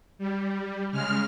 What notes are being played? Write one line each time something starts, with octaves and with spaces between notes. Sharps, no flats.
G3
C#3 G#3 F6